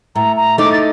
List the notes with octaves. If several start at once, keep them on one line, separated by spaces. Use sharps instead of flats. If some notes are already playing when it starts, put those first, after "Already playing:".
A2 A#5
A#5
A3 D#4 D6
A6